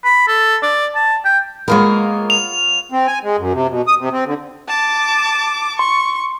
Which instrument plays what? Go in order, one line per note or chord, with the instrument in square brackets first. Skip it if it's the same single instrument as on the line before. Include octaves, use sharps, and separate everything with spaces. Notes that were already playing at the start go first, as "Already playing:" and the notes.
[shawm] B5
A4
D5
A5
G5
[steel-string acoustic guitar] G#3 A#3 A#4 [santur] B3 F4 C#5
[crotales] F7
[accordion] C4
G#5
G#3
F#2
C3
B2
D#6
C3
C4
D3
[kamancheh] A5 D6
[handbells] C6 [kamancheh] C#6